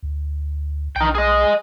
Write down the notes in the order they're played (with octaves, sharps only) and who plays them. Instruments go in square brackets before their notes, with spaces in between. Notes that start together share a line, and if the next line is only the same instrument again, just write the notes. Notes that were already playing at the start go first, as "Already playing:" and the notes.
[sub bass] D2
[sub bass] B1 [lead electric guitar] D#4 G5
[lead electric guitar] G#4 D#5